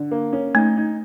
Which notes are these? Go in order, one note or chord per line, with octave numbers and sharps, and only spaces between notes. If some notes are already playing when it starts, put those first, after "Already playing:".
Already playing: D3
A#3
C#4
A3 D#4
D#4